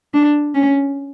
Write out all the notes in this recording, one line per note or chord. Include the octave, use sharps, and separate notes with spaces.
D4
C#4